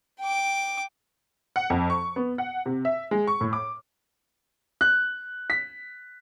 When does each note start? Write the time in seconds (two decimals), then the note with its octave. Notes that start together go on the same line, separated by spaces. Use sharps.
0.20 G5 D6
1.56 F#5
1.70 F2
1.90 C#6
2.16 B3
2.38 F#5
2.66 C3
2.85 E5
3.11 G#3
3.27 C#6
3.41 A2
3.53 D6
4.81 F#6
5.50 B6